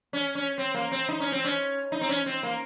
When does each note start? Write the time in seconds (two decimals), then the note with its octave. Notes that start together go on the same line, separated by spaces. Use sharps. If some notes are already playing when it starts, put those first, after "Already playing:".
0.13 C#4
0.35 C#4
0.58 C4
0.74 A#3
0.92 C4
1.09 D#4
1.20 C#4
1.32 C4
1.45 C#4
1.92 D#4
2.01 C4
2.09 C#4
2.26 C4
2.43 A#3